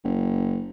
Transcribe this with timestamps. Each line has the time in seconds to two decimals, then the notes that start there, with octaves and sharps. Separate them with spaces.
0.04 F#1